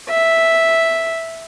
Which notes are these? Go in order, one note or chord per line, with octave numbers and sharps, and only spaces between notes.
E5